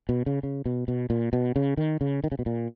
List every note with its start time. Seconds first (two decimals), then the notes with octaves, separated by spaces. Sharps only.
0.09 B2
0.26 C#3
0.43 C#3
0.66 B2
0.88 B2
1.10 A#2
1.33 B2
1.56 C#3
1.77 D#3
2.01 C#3
2.24 D#3
2.32 C#3
2.39 B2
2.46 A#2